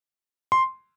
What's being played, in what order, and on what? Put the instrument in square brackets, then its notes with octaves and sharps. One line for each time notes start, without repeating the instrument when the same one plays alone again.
[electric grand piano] C6